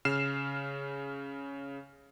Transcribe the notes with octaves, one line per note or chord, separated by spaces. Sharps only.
C#3 F6 C7 E7